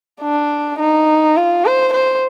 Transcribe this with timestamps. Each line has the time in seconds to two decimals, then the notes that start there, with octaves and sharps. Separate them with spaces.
0.22 D4
0.79 D#4
1.37 F4
1.65 C5
1.94 C5